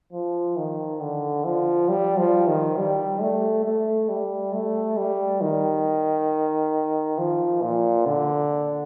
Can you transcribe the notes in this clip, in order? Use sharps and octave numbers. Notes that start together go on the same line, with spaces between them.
F3
D#3
D3
F3
G3
F3
D#3
G3
A3
A3
G3
A3
G3
D#3
F3
A#2
D3